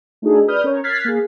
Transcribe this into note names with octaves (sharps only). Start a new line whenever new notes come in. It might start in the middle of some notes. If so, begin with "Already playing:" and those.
A3 D4 D#4 F#4 G#4 A4
B4 D5 B5 D#6 F6 G6
C#4 A#4 C#5
F6 F#6 G#6 A6 B6 C7
A#3 G#4